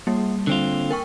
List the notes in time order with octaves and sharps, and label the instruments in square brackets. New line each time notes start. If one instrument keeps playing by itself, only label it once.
[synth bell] G3 A#3
[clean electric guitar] D3 C4 F4
[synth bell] A#4 G5 C#6